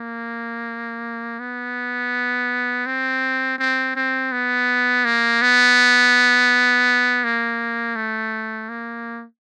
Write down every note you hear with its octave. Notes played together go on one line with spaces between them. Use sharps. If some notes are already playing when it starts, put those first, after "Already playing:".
Already playing: A#3
B3
C4
C4
C4
B3
A#3
B3
A#3
A3
A#3